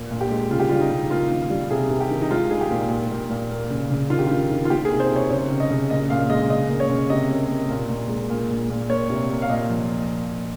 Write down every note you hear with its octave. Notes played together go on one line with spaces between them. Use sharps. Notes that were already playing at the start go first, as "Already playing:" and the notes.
Already playing: A#2
A#2
G4
G#3
C#3 F4
G4
G3 F4
D#4
C#3
A#3 F4
D#3
G3
C3 G#4
C3
G4
D#3
D#4
G#3 F4
G#3 G#4
G4
A#2
A#2
A#2
A#2
A#3
C#3
C#3
D#3 F4
G4
D#3 F4
D#3
F4
A#3 G4
G#4
C3
C5
C3
C#5
C#3 C#5
C#3
D#5
C#3
A#2 D#5
A#2 F5
G#3 D#5
C#3 D#5
A#3
C#5
C#3
C3 D#5
A#3
A#3
A#2
A#2
G#3
A#2
A#2
A#2
A#3 C#5
C3
A#3
F5
A#2 D#5
F3